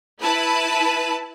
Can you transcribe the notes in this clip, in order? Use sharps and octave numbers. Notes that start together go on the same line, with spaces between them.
E4 B4 A5 B5